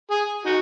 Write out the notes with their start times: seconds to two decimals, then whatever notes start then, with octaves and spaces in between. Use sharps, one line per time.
0.11 G#4
0.45 D#4 F#4